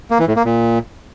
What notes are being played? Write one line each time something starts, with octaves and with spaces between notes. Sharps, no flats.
A#3
E3
A2
A#3
A#2